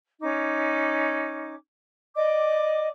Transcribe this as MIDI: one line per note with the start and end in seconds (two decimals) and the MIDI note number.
0.20 1.53 61
0.20 1.53 63
0.20 1.53 86
2.15 2.87 74
2.15 2.87 75
2.15 2.87 86